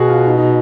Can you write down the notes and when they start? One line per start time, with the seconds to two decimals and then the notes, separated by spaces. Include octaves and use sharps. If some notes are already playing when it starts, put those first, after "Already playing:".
Already playing: B2 F#4 G#4
0.08 F4
0.26 D#4
0.38 D#4